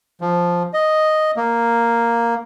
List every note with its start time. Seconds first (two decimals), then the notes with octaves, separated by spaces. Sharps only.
0.21 F3
0.74 D#5
1.37 A#3